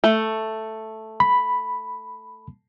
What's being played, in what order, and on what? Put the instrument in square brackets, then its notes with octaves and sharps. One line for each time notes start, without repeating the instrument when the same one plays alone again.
[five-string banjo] A3
[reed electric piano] B5